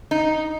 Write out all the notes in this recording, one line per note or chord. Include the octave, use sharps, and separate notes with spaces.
D#4